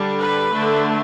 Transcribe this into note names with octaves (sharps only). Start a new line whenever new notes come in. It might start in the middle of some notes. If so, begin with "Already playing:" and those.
Already playing: D3 G3 D4
B4
D3 A3 D4